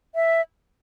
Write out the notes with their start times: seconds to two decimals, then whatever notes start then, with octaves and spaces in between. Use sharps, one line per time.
0.15 E5